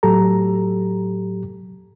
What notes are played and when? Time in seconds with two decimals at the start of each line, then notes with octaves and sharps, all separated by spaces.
0.03 A2 F#3 G4 A4 A#5